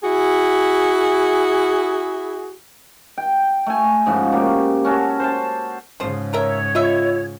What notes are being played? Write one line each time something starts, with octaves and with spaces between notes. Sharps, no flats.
E4 F#4 G#4
G5
A3 G#5
G#2 C#3 F3 F#4
A#3 G4 C#5
C#4 F#4 A4
C5 C#5 A5
G#2 C#3 F3 C5
F3 A#4 C#5 E5
F4 D#5 E5